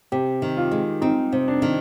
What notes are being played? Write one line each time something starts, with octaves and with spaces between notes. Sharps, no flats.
C3 G4
D#3
F4
G#3
C4 D#4
C3
D4
D#3